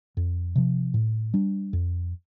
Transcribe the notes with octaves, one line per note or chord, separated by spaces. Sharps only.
F2
C3 F3
A2
G3 D4
F2